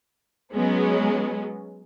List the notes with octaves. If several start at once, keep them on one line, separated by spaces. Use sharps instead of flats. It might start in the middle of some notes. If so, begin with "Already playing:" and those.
F#3 G#3 B3 C#4